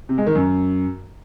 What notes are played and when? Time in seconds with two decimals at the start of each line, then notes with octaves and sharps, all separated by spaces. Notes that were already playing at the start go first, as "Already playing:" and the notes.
0.09 C3
0.18 G#3
0.26 D#3
0.35 F#2